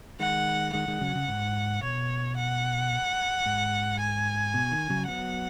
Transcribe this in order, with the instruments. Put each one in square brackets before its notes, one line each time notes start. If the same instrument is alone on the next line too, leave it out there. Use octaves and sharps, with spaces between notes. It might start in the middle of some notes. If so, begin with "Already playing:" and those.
[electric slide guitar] D#3 G#3 [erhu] F#5
[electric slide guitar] D#3 G#3 [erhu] F#5
[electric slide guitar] D#3 G#3
C#3 F#3
C#3
G#2
[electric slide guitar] B2 [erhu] C#5
[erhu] F#5
[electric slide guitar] G#2
[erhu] G#5
[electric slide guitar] B2
D#3
C#3 F#3
[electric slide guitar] F#3 B3 [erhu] F#5